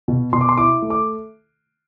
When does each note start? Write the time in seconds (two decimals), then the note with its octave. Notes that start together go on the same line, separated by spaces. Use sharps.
0.08 B2
0.33 B2 C6
0.41 D6
0.49 C6
0.57 E4 D6
0.82 A3
0.90 D6